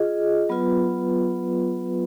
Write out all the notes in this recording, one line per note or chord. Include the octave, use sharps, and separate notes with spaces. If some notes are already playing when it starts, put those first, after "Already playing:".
Already playing: F4 G#4 D#5
F#3 B3 F4 B4